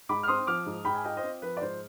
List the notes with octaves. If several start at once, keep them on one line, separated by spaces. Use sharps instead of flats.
G#2 B5 D6
F6
C4 C6 D#6
F3 D6 F6
G#2
G#2 G5 B5
G#5
F4 D#5 G5
C5 D#5
C4
F3 B4
D5
G#2 C5